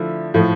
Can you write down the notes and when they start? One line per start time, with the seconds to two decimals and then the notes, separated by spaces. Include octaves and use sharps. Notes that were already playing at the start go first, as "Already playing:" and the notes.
Already playing: D3 F3 A3 E4
0.34 A2 F3 A3